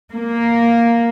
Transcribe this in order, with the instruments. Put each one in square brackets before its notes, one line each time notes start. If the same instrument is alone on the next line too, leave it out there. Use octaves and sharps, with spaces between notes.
[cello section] A#3